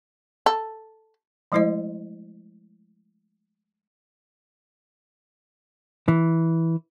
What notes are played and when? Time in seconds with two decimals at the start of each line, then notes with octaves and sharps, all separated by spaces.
0.46 A4
1.52 F3 G#3 A3 E4 C5 D#5
6.08 E3